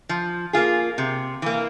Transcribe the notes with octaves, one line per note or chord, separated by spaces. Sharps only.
F3
A#3 F4 G#4
C3
E3 A#3